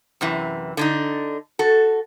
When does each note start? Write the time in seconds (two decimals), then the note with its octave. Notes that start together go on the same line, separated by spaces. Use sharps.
0.21 F#2 C3 E3
0.77 D3 D4 D#4
1.59 F#4 A4